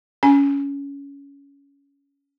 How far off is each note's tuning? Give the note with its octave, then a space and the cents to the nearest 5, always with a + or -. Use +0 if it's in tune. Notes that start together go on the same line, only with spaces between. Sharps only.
C#4 +15 G#5 +5